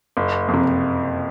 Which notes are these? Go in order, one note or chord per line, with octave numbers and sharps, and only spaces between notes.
F#1
F2
C3